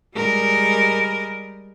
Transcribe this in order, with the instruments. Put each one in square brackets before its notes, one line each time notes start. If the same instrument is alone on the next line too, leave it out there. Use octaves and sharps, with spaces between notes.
[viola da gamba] G3 G#3 A#4